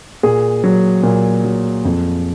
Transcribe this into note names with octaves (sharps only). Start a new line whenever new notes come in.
A#2 G#4
F#3
A#2
F#3
F2